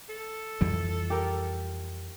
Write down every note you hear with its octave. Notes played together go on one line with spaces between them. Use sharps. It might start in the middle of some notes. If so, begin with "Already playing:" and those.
A4
F2 E3 G3
G4 A#4